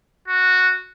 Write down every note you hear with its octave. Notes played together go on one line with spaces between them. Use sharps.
F#4